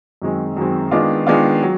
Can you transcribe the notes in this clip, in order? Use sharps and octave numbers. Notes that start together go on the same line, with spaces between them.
F#2 D#3 G#3 C4
F#2 D#3 G#3 C4
D#3 G#3 B3 D4 F4
D#3 G#3 B3 D4 F4
F#3